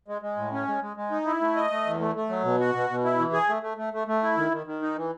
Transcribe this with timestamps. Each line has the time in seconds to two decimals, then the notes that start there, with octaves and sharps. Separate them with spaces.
0.08 G#3
0.22 G#3
0.37 A2
0.52 C#4
0.67 G#3
0.82 G#3
0.97 G#3
1.11 D#4
1.25 E4
1.41 A3
1.56 D#5
1.71 A3
1.85 E2
2.00 A3
2.16 A3
2.29 F#3
2.44 B2
2.60 F#4
2.75 B2
2.90 B2
3.04 E4
3.19 E3
3.33 G#4
3.49 A3
3.63 A3
3.77 A3
3.93 A3
4.07 A3
4.23 E4
4.37 D#3
4.52 D#3
4.66 D#3
4.82 D#4
4.97 E3